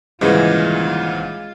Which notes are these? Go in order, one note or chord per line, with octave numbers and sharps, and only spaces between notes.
D#1 G#2 C#3 E3 G#3 F4